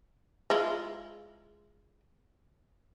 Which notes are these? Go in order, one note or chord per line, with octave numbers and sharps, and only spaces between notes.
G#3 E4 F4